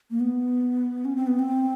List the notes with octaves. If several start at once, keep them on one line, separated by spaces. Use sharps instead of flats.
A#3
B3
C#4
C4
B3
C4